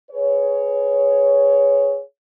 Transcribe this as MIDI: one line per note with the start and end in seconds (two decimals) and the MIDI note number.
0.12 2.00 68
0.12 2.00 71
0.12 2.00 73